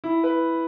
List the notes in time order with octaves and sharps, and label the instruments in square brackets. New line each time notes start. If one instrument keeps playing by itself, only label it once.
[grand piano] E4
B4